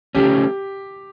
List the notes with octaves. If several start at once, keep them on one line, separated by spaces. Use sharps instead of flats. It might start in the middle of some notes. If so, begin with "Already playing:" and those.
C#3 F3 A3 C#4 G4